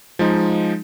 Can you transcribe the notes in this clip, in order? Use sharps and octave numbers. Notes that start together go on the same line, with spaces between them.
F3 G#3 D#4